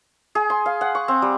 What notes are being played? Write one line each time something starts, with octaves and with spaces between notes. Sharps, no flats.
G#4
C6
F5
F#5
C#6
C4
G3